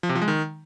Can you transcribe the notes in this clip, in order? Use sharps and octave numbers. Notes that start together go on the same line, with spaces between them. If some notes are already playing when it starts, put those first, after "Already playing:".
F3
C3
F3
G#3
D#3